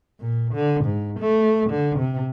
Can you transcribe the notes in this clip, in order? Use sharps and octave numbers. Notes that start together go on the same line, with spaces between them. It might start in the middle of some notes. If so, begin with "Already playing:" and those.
A#2
D3
G#2
A3
D3
C3